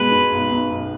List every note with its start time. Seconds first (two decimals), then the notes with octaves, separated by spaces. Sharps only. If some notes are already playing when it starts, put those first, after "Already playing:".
Already playing: B2 G#3 B4
0.12 B2
0.31 B1
0.51 B1
0.71 B1